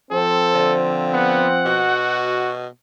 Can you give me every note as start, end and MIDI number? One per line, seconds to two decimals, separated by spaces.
0.11 1.85 53
0.11 1.85 60
0.11 0.74 69
0.54 1.44 50
1.12 1.48 59
1.12 2.26 78
1.66 2.67 47
1.66 2.54 66